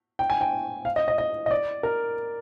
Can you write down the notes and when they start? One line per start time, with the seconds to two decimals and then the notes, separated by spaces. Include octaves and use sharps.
0.19 G5
0.30 G#5
0.41 G5
0.85 F5
0.96 D#5
1.08 D#5
1.18 D#5
1.46 D#5
1.51 D5
1.83 A#4